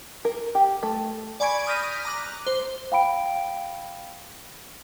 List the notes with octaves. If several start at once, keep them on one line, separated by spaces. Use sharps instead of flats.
A#4
G4
A3
D5 G#5 B5 C#6 G#6 D7
D#6 F6 G6 A#6 B6 D#7
A#5 D6 F#6
C5
F5 G5 B5 D7